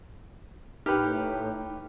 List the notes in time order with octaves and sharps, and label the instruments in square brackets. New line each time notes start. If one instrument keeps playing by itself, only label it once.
[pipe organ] A2 [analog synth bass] D#4 [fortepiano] G4 B4 [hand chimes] G5 F6